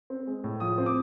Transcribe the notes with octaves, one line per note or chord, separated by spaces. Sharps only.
C4
G#3
A2
F3 D#6
C4
D6